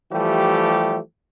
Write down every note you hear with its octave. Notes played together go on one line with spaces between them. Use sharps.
E3 F3 G3 A3 G4